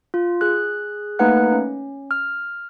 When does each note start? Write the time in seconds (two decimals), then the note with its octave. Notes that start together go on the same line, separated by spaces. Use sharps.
0.14 F4
0.41 G#4 F#6
1.19 A3 A#3 D#4 B4 F#5 F#6
1.52 C#4
2.11 F6